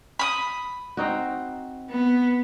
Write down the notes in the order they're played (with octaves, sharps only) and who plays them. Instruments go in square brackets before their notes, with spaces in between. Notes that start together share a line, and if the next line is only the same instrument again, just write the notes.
[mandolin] B5 D#6
[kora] C4 D#4 F#4
[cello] B3